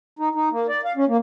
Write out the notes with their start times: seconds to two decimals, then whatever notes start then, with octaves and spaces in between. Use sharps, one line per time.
0.19 D#4
0.35 D#4
0.52 A#3
0.69 D5
0.85 F5
0.97 C#4
1.08 A#3